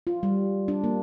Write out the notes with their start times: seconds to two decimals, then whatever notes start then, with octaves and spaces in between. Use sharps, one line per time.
0.07 F4
0.23 G3
0.68 D4
0.84 A#3